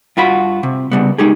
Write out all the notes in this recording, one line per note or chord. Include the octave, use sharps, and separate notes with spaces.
G2 F4 F#4 B5
C3
C#3 G3 B3
G#3 D#4 G4 G#4